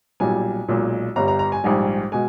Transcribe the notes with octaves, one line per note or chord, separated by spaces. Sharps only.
B1 A#2 G3 G#5
B1 A#2 G#3
G1 G2 G3 A#5
A#5
A#5
G#5
A#1 G#2 G3 G#5
B2 G#3 G#5